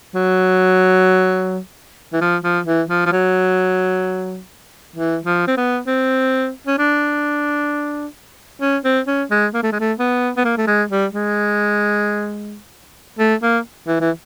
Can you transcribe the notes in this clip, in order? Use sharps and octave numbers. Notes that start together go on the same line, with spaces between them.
F#3
E3
F3
F3
E3
F3
F3
F#3
E3
F3
C4
B3
C4
C#4
D4
C#4
C4
C#4
G#3
A#3
A3
G#3
A3
B3
B3
A#3
A3
G#3
G3
G#3
A3
A#3
E3
E3